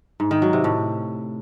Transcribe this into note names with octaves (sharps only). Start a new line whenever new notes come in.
G#2
D#3
F#3
C3
A2